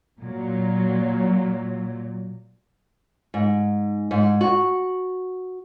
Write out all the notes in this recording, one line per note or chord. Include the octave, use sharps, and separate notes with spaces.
A#2 F#3
G#2
G#2
F#4